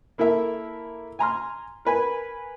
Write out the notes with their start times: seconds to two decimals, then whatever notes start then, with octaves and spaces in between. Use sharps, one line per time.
0.18 A#3 E4 A4 A#4 E5
1.19 G#5 A#5 C6 F6
1.85 A#4 B4 G#5